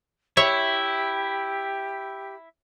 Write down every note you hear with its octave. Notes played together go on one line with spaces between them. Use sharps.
E4 G4 C#5 E5